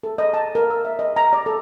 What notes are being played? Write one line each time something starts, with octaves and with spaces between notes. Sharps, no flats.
A4
D#5
A5
A#4
E6
E5
D#5
A#5
D5
A4